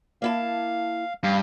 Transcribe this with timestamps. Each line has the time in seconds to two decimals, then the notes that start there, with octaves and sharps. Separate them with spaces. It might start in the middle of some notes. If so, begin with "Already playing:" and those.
0.22 A#3 E4 F5 A5
1.24 G2 F5